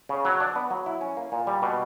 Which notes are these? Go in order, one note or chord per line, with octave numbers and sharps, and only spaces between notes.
C#3
F#3
D4
B3
F#3
E4
C#4
A#3
A#2
G3
B2